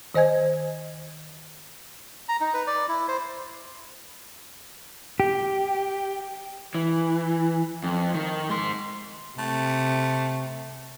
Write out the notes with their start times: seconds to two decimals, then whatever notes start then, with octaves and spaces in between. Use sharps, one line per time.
0.15 D#3 C5 D#5 G#5 G#6
2.29 A#5
2.40 D#4
2.54 B4
2.67 D5
2.88 E4
3.08 C5
5.20 G4
6.75 E3
7.84 F2
8.14 D#3
8.50 G#2 C6
9.39 C3 A3